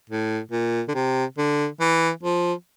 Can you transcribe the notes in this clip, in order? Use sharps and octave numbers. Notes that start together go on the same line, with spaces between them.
A2
A#2
D3
C3
D3
E3
F3